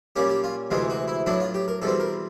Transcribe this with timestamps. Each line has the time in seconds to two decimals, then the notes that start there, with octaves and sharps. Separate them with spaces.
0.16 A#2 G3 A#3 C#4 G4
0.29 G4
0.44 F4
0.71 D2 C3 E3 G#3 F4
0.90 F#4
1.08 E4
1.26 A2 F#3 B3 D4 E4
1.40 F4
1.54 G4
1.68 A#4
1.82 E2 B2 G3 C4 A4
2.00 A#4